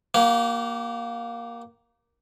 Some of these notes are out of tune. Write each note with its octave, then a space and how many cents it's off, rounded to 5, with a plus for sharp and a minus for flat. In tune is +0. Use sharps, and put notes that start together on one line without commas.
A#3 +10 G4 -40